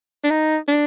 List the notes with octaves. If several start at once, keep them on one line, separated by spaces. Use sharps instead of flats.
D4
D#4
D4